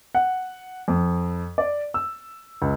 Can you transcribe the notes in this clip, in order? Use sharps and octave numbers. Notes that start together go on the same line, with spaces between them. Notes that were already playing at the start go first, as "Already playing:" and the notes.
F#5
F2
D5
E6
C#2